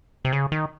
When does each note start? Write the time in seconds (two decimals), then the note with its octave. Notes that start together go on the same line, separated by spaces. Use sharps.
0.25 C3
0.33 C#3
0.52 D#3